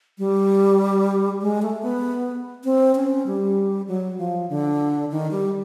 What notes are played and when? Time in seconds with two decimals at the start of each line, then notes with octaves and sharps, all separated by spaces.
0.18 G3
1.42 G#3
1.62 A3
1.83 B3
2.64 C4
2.95 C#4
3.27 G3
3.88 F#3
4.18 F3
4.50 D3
5.11 D#3
5.31 G3